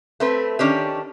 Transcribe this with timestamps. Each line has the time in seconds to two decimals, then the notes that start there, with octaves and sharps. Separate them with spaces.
0.20 A3 C4 B4
0.59 D#3 C#4 D4 G4